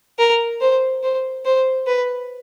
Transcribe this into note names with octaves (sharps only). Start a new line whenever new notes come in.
A#4
C5
C5
C5
B4